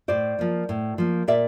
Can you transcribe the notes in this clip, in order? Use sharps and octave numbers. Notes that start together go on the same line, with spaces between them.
A2 C5 D5
F3 A#3
A2
F3 A#3
A#2 D5 E5